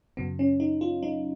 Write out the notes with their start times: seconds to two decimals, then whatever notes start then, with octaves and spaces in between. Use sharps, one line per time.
0.17 F#2 C#3 F#3 B3
0.39 C#4
0.60 D#4
0.81 F4
1.03 D#4